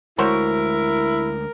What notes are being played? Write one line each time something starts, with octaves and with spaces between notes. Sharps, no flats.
D2 G#3 E4 F#4 A#4 C5 C#5